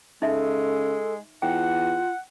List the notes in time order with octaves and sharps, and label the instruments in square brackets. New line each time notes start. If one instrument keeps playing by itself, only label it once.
[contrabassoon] C#3 [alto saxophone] G#3 [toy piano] D#4 E5 [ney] A4
[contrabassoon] E2 [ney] F4 [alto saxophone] F#5 [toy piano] G5